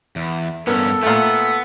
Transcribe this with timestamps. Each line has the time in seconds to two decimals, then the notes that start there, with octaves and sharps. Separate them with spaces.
0.16 E2
0.67 G2 B3 C#4 A4 A#4
1.03 A#2 A3 B3